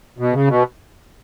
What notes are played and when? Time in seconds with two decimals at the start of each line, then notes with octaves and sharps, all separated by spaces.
0.19 B2
0.33 C#3
0.48 B2